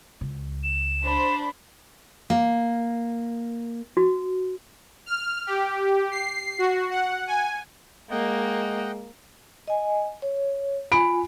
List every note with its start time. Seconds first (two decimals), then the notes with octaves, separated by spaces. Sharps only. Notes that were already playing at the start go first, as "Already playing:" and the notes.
0.21 C#2
0.63 E7
1.04 D4 C5 B5
2.30 A#3
3.97 F#4
5.06 F6
5.47 G4
6.11 C7
6.58 F#4
6.90 F#5
7.27 G#5
8.11 G#3 A#3 D#5 F#5 G5
9.68 D#5 G#5
10.22 C#5
10.92 F4 G#5 B5 D7